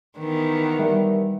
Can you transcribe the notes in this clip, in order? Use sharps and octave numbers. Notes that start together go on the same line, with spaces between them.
D#3 E3 B3
G3 A#4 E5